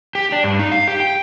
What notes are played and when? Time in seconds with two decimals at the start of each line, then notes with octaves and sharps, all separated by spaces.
0.15 G4
0.32 D4
0.44 G2
0.59 D#4
0.72 F5
0.87 G4
1.00 G5